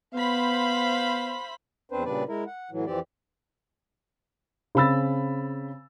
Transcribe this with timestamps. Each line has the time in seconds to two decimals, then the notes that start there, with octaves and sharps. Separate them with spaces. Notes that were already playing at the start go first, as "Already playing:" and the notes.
0.14 B3 C5 F5 B5
1.90 E2 C4 D4 B4 C5
2.05 A#2 C#3 G3 D4 B4 D5
2.28 G#3 E4 A#4
2.46 F#5
2.71 A2 E3 F#3
2.86 F2 E3 C4 G4 D5
4.75 C#3 C4 B5 E6 A6